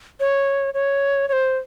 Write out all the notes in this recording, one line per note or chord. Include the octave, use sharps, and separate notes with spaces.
C#5
C#5
C#5
C5